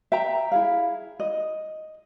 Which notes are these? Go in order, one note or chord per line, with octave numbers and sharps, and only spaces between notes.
E5 G5 A#5
E4 G#4 F5
D#5